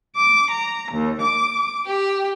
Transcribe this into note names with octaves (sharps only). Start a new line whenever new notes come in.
D6
A#5
D#2
D6
G4